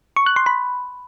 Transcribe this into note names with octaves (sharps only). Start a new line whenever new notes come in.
C#6
F#6
C6
B5